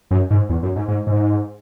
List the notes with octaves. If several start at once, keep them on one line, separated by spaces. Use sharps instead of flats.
F#2
G#2
E2
F#2
G#2
G#2
G#2